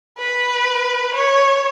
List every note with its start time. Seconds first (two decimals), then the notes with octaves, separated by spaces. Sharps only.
0.18 B4
1.14 C#5